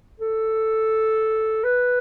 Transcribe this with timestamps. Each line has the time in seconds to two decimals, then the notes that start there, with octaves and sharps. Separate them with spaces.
0.20 A4
1.64 B4